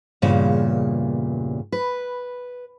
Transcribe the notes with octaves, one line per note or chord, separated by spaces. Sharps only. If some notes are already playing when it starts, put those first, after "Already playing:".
E2 G2 A#2 C#3
B4